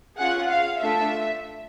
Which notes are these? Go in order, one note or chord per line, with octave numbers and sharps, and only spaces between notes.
C#4 F4 G#4 F#5
F5
A3 D4 F4 A4 E5